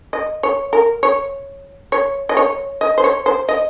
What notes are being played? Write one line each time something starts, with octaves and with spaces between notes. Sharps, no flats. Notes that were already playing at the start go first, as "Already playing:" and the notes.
D#5
C#5
A#4
C#5
C#5
D#5
C#5
D#5
C5
C#5
C5
D#5